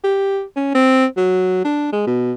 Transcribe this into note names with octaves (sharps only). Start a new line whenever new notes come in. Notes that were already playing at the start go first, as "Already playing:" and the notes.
G4
C#4
C4
F#3
D4
G#3
B2